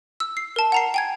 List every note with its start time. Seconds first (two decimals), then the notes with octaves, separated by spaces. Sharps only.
0.20 E6
0.37 C7
0.56 A#4 A5
0.72 F#5 A#5 C7
0.94 G5 G#5 G#6